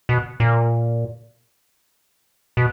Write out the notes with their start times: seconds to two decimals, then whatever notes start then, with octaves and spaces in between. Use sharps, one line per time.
0.09 B2
0.40 A#2
2.57 B2